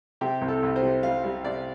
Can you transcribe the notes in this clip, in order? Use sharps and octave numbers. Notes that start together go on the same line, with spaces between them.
C3 G4
C2
A4
C2
C5
C3
G3 F5
G3
C3 D5